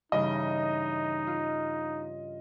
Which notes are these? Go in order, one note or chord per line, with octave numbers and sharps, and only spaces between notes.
G2 C#3 E3 D#4 D#5
F4